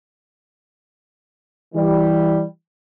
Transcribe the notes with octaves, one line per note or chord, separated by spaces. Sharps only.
E3 G3